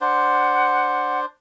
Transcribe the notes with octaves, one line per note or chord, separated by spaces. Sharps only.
D4 C5 F#5